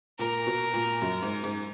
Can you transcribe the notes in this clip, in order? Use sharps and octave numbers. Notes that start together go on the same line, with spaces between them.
A#2 A#4
B2
A#2
F#2
G#2
G#2